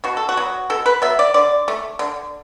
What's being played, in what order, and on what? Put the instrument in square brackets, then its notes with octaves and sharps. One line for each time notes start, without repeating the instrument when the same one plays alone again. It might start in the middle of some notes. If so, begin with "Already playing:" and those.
[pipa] B2 F#4
A4
F#4
F#3 B3
B2 A4
B4
F#3 B3 E5
D5
D3 D5
A3
D3